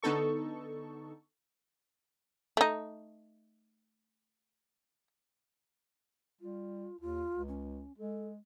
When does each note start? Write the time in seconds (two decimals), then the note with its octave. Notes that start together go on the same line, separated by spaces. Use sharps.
0.03 D3 B3 D#4 A4 C#6
2.57 A3 D#4
6.41 G3 F4
7.01 D#2 F4
7.32 C#2
7.48 C#4
7.98 G#3 A4